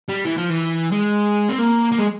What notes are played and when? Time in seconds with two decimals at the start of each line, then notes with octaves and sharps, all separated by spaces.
0.09 G3
0.25 E3
0.37 F3
0.50 E3
0.92 G#3
1.49 C4
1.59 A#3
1.92 A#3
1.99 G#3